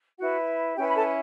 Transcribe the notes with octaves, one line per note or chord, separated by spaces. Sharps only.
E4 F#4 B4 F#5
C#4 E4 G4 B4 G5
B5
A4 A5